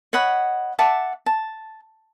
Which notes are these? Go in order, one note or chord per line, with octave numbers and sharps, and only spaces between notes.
C#5 D#5 F#5 B5
E5 F#5 A5 D6
A5